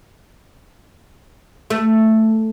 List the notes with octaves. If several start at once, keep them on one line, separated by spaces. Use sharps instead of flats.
A3